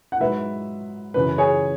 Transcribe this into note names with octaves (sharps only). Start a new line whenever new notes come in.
F#5
G#2 F#3 B4 E5
F#2 C#3 E3 B4
G#4 C#5